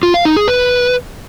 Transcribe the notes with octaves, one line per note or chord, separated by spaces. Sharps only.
F4
F5
D#4
G#4
B4